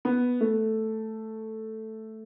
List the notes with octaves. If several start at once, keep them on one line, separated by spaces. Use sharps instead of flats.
B3
A3